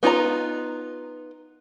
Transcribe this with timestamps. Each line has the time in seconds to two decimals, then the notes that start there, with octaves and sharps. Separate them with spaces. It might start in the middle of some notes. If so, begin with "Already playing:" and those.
0.03 B3 D#4 F4 B4 A#5